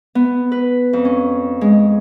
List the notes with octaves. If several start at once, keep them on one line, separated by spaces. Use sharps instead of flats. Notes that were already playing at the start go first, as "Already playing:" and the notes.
B3
B4
F2
C#4
G#3